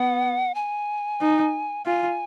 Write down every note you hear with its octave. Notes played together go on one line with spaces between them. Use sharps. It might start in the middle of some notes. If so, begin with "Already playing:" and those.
Already playing: B3 F#5
G#5
D#4
F4 G#5